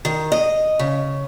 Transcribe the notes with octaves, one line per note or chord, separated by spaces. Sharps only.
D#3
D#5
C#3